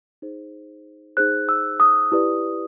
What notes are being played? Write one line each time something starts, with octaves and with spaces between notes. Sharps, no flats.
D#4 G#4 C5
D#4 G#4 C5 F#6
E6
D#6
E4 G4 B4 D5